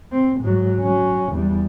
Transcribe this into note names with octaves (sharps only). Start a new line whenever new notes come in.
C4
G#2 F#3
F#3 C#4
E2 G3